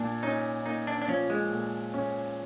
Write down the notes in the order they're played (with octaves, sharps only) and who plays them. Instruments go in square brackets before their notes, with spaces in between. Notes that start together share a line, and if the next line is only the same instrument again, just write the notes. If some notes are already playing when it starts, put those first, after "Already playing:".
Already playing: [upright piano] A#2 [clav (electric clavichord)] D4
[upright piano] C#4 [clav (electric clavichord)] D#4
[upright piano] A#3 [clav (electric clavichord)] D#4
[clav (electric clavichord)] D4
D4
[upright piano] F3 [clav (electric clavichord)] C#4
[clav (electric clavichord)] G#3
[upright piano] A#2
C#4